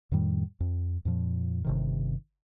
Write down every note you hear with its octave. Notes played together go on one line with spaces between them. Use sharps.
F2 A2 D#3 G3
F2
F2 A#2 F3
G1 C3 D#3